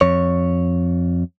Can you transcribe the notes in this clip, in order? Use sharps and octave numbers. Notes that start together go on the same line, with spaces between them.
F2 C#5